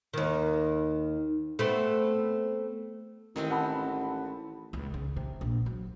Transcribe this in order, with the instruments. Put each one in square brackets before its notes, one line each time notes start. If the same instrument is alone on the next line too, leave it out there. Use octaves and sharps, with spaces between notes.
[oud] D#2 D#3
A3 B3 C4
[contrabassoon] A1 [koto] D#3 G#3 C4
[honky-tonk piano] F#5 A5 B5
[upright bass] C#2
C#3
C3
A#1
F#3